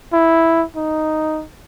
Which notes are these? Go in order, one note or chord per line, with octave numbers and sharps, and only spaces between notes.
E4
D#4